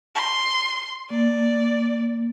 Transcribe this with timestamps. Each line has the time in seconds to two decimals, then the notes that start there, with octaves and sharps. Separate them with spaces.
0.15 C6
1.10 A#3 D5